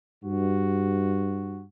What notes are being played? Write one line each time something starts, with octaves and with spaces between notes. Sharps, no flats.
G2 F#4